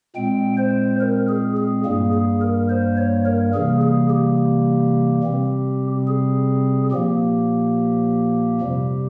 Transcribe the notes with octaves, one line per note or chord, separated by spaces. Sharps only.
A#2 G#3 C4 G5
C5
A#4
G#4
G#4
G2 G3 A#3 G#4
G#4
A#4
C5
C#5
A#4
C3 E3 G3 A#3 G#4
G#4
G4
C3 G3 C4
G#4
A#2 F3 A#3 G4
F2 C3 G3